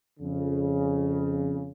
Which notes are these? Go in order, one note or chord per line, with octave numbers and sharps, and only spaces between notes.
F2 C#3